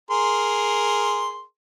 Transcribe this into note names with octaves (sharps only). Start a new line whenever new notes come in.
G#4 A#4 C6